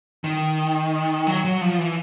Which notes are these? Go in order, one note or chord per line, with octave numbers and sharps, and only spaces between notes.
D#3
F#3
F#3
F3
E3